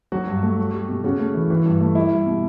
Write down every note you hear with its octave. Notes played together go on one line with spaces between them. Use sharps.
F#3 F#4
G2
A3
G3
G3
B2
C#3 F#4
A3
E3
E3
G2
A3
G3 E4
G3
B2